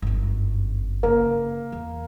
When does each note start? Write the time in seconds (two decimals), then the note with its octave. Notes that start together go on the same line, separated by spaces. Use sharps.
0.02 G1 F#2
1.03 C#3 A#3
1.72 E2